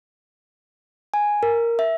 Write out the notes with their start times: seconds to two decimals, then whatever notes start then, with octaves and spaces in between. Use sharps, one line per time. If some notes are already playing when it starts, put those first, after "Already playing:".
1.14 G#5
1.43 A#4
1.79 E5